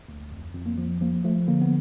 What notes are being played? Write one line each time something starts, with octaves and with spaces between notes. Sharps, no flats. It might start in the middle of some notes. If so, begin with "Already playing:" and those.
D2
F2
F2
A#3
F3
F3 A#3
F3 A3
D3 A#3
B3